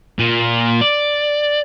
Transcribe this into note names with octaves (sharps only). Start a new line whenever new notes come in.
A#2
D5